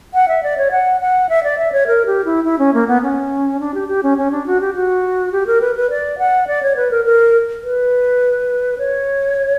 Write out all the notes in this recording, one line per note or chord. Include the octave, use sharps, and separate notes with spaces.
F#5
E5
D5
C#5
F#5
F#5
E5
D5
E5
C#5
A#4
G4
E4
E4
C#4
A#3
B3
C#4
D4
G4
G4
C#4
C#4
D4
F#4
G4
F#4
G4
A#4
B4
B4
D5
F#5
D5
C#5
B4
A#4
A#4
B4
C#5